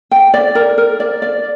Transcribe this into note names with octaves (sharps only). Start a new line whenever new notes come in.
G5
D5
A#4
A#4
D5
D5